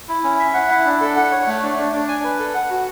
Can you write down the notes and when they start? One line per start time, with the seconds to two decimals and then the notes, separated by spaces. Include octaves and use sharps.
0.08 E4
0.24 C#4
0.39 E5
0.54 F#5
0.69 E4
0.85 D4
1.01 A4
1.16 F#5
1.32 C#5
1.47 A3
1.62 D4
1.78 D4
1.93 D4
2.09 G#5
2.24 B4
2.39 A4
2.54 F#5
2.70 F#4